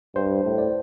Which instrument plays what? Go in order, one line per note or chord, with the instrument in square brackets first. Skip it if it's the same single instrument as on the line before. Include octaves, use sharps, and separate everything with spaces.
[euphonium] G2 [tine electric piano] C5
[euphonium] A2
[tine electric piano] D5